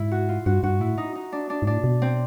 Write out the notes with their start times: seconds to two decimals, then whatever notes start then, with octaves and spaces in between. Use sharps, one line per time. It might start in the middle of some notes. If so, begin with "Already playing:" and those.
Already playing: G#2 E4
0.11 F#4
0.29 F4
0.46 G2 F#4
0.63 G2 F#4
0.80 A2 E4
0.98 D#4
1.15 D#4
1.32 D4
1.50 D4
1.62 G#2
1.67 A2 D4
1.78 A#2
1.84 B2
2.02 C4